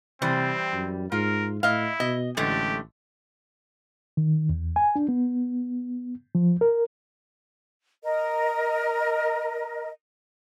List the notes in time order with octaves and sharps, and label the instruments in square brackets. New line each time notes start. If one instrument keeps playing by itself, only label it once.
[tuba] C3 [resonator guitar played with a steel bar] E3 G3 C5 [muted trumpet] C4
[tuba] F#2
[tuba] G#2 [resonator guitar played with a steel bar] F4 [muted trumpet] A#4
[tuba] A2 [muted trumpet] E4 [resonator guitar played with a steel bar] D#5 F5
[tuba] B2 [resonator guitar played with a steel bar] D#5
[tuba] A1 [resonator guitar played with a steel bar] D3 G#3 A3 [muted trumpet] G4
[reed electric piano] D#3
E2
G#5
D4
B3
F3
A#4
[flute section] A#4 D#5